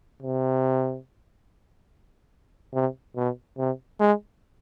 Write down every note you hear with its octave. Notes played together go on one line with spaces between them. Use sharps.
C3
C3
B2
C3
G#3